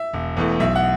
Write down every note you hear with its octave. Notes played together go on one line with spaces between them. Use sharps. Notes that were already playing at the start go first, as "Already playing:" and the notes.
Already playing: E5
E1
E2 E3 A3
B1 E5
F#5